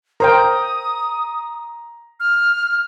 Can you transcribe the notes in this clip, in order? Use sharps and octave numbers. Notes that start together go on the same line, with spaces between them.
A#4 C5 G5 A#5 D#6
F6